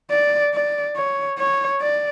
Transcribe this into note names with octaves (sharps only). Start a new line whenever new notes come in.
D5
D5
C#5
C#5
D5